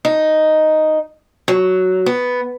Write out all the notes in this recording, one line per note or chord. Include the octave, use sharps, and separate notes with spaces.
D#4
F#3
B3